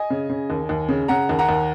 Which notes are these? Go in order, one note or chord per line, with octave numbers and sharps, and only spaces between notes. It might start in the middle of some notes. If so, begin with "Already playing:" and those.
Already playing: D#5 G#5
C#3
C#3
D#2
D#2
C#3
C#3 F#5 A#5
D#2
F#5 A#5
D#2